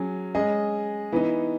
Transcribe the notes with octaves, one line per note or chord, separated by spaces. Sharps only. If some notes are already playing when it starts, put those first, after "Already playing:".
Already playing: F#3 C#4 G#4
G#3 C#4 G#4 D#5
E3 B3 D#4